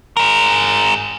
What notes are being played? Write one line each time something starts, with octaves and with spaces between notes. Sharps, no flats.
G#4 A#4